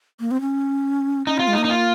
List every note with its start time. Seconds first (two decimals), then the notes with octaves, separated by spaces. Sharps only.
0.20 A#3
0.31 C4
0.41 C#4
1.27 C#4 D#4
1.38 C4 F4
1.48 G#3
1.53 D#4
1.58 A#3
1.65 D#4
1.70 F4